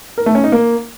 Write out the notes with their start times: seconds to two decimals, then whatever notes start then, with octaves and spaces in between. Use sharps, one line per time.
0.18 A#4
0.26 A3
0.35 C#4
0.44 D#4
0.52 A#3